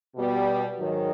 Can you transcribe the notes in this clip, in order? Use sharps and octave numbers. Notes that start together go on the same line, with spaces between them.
B2 G3 B3
G#2 D#3 F#3